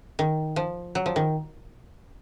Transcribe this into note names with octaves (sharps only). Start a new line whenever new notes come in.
D#3
F3
F#3
F3
D#3